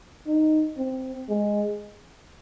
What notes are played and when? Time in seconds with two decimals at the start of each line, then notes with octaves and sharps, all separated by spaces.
0.27 D#4
0.78 C4
1.29 G#3